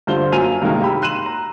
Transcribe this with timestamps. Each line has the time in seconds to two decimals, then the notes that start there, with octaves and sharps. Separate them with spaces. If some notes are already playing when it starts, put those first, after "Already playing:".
0.07 G2 D3 F4 C5 F5 G7
0.32 F#2 A#3 F4 G#5 D#7 F7
0.61 D2 G2 C3 D#3 G#3 A#3
0.82 G4 B5 E6
1.02 C6 F#6 D#7 E7 F#7
1.26 A#5